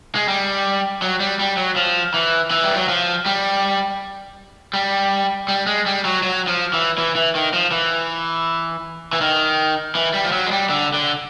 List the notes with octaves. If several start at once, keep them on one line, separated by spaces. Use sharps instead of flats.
G#3
G3
F#3
G3
G3
F#3
F3
E3
E3
G3
F#3
F3
G3
G3
G3
G#3
G3
F#3
F#3
F3
E3
E3
E3
D#3
F3
E3
E3
D#3
E3
G3
F3
F#3
G#3
G3
D3
D3